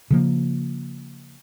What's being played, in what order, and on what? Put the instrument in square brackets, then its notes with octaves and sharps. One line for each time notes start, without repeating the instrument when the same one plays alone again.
[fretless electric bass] C#3 F3 A#3